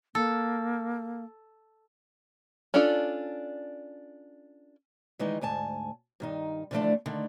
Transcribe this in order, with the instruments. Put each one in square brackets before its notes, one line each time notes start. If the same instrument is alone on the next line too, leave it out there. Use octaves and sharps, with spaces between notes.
[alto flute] A#3 [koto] A4
[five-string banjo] C#4 D4 F4 A4 D5
[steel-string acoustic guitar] D#3 E3 G#3 D#4
D2 G#2 G#5 A5
G2 D#3 D#4
D3 E3 F3 G3 A3 D4
D3 D#3 A3